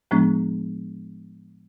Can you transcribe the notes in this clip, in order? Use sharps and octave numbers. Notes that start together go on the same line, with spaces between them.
A2 F3 G#3 B3 D4